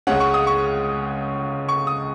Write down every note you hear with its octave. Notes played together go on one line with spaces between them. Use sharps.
C#2 C#3 G#3 C#4 F#5
C#6
D#6
C#6
C#6
D#6